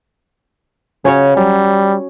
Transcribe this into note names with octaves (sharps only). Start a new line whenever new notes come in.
C#3 C#4 F#4 C#5
F#3 G3